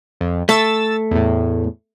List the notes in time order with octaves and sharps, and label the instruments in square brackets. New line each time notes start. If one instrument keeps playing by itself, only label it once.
[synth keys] F2
[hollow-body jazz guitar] A3 [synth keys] E6 A6
[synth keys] E2 A2